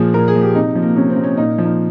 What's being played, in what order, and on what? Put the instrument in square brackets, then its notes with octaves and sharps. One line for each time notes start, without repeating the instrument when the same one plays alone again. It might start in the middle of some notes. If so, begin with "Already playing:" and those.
Already playing: [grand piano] A#2 F3 G#4
A#2 A#4
G#4
F3
G4
C3 D#4
F3
A#3
C3 C#4
C4
F3
C#4
A#2 D#4
F3
D#4